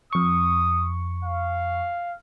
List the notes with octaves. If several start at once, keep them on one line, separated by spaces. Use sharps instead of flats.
F2 C#6 D#6
F5